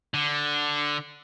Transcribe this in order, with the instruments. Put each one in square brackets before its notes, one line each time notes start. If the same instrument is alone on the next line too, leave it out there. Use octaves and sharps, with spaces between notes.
[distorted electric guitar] D3